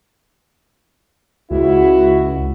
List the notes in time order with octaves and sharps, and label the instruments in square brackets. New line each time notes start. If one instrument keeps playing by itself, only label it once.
[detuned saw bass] C#2 [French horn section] G#3 E4 F#4